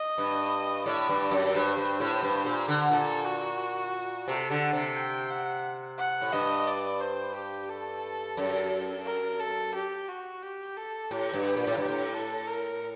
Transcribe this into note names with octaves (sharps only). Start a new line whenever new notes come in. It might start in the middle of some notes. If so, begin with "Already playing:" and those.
Already playing: D#5
G2
A2 D5
G2
F#2
G2 C5
G2
A2
G2
A#2
D3
A#2 A4
F#4
C3 A4
D3
C3
G5
F#5
F#5
A2
G2 D#5
D5
C5
G4
A4
F#2
A#4
A4
G4
F#4
G4
A4
A2 G4
G2
G4
A#2
A2
G2 G4
A2
A4
A#4